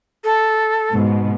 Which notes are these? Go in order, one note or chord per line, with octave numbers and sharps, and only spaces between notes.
A4
G#2 B2 B3